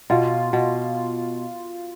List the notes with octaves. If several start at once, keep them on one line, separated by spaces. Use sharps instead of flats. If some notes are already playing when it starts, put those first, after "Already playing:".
B2 F4
B2